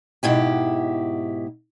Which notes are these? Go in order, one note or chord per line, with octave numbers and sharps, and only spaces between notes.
G#2 B2 E4 G4